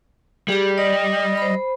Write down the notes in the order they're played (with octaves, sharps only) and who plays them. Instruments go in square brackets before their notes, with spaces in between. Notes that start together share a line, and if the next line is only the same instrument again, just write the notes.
[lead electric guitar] G3 [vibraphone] G4 G#4
[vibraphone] D5 [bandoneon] D#5
[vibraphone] C5 B5